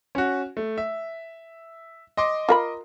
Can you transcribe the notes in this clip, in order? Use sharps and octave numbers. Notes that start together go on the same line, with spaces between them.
C#4 F#4
A3
E5
D#5 C6 D6
F4 A#4 B5